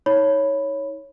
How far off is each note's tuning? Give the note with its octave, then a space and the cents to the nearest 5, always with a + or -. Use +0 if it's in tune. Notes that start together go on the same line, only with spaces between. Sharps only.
D#4 +35 C#5 +0 B5 +0